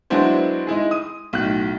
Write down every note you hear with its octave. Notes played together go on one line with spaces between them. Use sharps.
F#3 G#3 B3 D4 E4 C5
G#3 D#4 E4 G#4
D#6 D#7
B1 A2 F#6